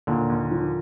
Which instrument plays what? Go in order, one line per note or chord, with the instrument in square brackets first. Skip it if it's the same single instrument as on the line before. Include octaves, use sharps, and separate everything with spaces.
[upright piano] D#2 [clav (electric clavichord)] A#2 D3
[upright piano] D#2
F3